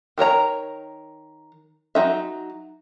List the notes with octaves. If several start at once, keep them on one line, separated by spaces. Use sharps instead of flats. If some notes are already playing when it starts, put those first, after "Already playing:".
D#3 A#4 C#5 A#5
F#3 D#4 E5